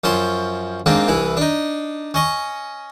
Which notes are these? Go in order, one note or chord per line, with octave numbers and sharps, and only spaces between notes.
F#2 F3 C#4 C5
G#2 A#3 C4 D4
C2 E3 E4
D4 D#4
C#4 D#5 C#6